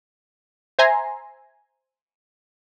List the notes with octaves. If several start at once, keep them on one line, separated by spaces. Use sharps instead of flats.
C5 E5 G#5 A#5 C6